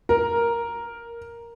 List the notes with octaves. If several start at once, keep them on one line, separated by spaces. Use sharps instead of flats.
A#4